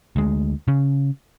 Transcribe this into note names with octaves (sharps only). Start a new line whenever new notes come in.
D2 G#3
C#3 C#4